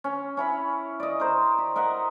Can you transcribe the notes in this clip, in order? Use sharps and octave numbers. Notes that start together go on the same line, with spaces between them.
C#4
C#4 E4 B5
D5 D#5
A#4 C5
G4
A#4 D#5 E5 F#5